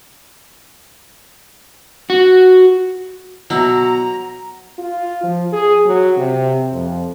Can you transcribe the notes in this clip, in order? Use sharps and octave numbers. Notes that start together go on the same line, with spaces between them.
F#4
B2 F#3 E4 A#5
F4
F3
G#4
F#3
C3
F2